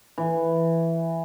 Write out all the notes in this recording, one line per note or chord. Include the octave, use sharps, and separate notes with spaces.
E3